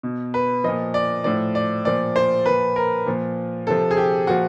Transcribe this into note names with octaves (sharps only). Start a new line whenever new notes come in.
B2
B4
A#2 F3 D#5
D5
A2 F3 D5
D5
A#2 F3 D5
C5
A#2 F3 B4
A#4
A#2 F3
C3 F3 A4
G#4
G4
A#2 F3 F#4